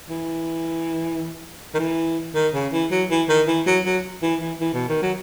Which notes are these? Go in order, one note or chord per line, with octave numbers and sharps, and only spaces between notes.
E3
D#3
E3
D#3
C#3
E3
F#3
E3
D#3
E3
F#3
F#3
E3
E3
E3
B2
D#3
F#3